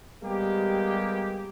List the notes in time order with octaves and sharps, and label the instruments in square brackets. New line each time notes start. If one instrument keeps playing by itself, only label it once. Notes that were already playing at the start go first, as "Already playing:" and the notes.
[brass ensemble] G3 G#3 A#3 B3 G4